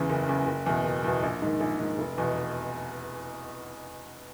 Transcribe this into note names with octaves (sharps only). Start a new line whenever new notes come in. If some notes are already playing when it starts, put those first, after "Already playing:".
Already playing: E2 C#3 E3
F#1
E2 C#3 E3
F#1
E2 B2
F#1
E2 B2
A#1
G#2 D#3
A#1
G#2 D#3
F1
E2 B2